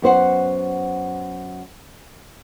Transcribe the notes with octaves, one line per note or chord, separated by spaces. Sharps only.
F#2 B3 C5 F#5